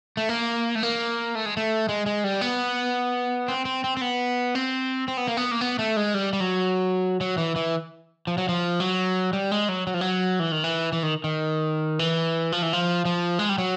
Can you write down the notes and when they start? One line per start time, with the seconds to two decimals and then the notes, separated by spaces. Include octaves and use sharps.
0.17 A3
0.29 A#3
0.75 A3
0.83 A#3
1.35 A3
1.46 G#3
1.57 A3
1.89 G#3
2.06 G#3
2.24 G3
2.41 B3
3.48 C4
3.65 C4
3.84 C4
3.97 C4
4.01 B3
4.55 C4
5.08 C4
5.17 B3
5.28 A#3
5.37 B3
5.51 A#3
5.61 B3
5.79 A3
5.96 G#3
6.14 G3
6.33 G3
6.40 F#3
7.21 F#3
7.38 E3
7.56 E3
8.27 F3
8.38 F#3
8.49 F3
8.80 F#3
9.33 G3
9.51 G#3
9.69 F#3
9.87 F#3
9.94 F3
10.01 F#3
10.39 E3
10.52 D#3
10.64 E3
10.93 E3
11.03 D#3
11.24 D#3
11.99 E3
12.52 F3
12.62 E3
12.73 F3
13.05 F3
13.39 G#3
13.49 G3
13.58 F#3